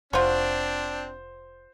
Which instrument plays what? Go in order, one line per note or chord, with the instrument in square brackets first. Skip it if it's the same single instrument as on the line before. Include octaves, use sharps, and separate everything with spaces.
[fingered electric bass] F1 [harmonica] C4 D4 [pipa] F4 F#4 [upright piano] C5